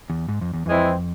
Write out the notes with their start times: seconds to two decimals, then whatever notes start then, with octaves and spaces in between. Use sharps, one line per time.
0.10 E2
0.28 G#2
0.41 F2
0.53 E2
0.66 F2 E3 G#3 C4 E4